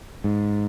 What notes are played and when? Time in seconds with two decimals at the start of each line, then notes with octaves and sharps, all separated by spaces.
0.24 G#2